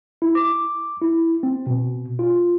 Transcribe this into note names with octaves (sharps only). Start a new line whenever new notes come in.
E4
D6
E4
C4
B2
F4